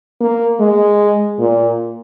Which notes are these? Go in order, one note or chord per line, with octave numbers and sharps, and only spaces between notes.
A#3
G#3
A#2